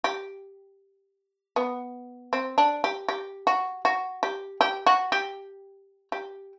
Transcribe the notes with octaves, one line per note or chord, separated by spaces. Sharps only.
G4
B3
C4
D4
G4
G4
F#4
F#4
G4
G4
F#4
G4
G4